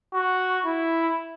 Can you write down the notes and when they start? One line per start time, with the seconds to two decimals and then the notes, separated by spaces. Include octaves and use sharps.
0.14 F#4
0.66 E4